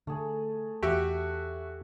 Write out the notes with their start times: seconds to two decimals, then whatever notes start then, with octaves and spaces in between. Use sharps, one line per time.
0.07 D3 A3 G#4
0.83 E2 F#4 G4 E5